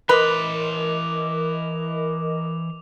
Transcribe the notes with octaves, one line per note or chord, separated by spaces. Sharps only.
E3 A#4 B4 D#5 C6 D6 F7